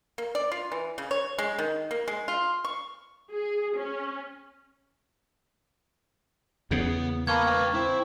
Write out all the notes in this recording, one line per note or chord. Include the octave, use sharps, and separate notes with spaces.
A#3
D5
F4
E3
C#3
C#5
G#3
D#3
A#3
G#3
F4
C#6
G#4
C#4
E2 C#3 B3
A#3 B3 A5 B5 C#6 G#6
B4 G5
C4 E4